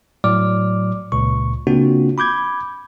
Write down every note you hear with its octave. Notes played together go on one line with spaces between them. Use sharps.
A2 F#3 D5 D6 F6
C#2 A#2 C#6
C#3 A#3 C4 D4 F4 F#4
B5 D6 G6 G#6